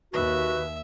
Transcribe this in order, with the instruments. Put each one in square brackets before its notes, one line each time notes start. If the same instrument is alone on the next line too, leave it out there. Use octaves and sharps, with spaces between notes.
[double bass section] D#2 [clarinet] F#4 [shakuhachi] B4 [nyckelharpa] E5